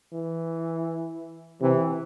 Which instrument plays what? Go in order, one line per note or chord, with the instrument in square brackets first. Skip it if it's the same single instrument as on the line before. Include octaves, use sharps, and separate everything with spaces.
[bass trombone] E3
[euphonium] C3 [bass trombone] E3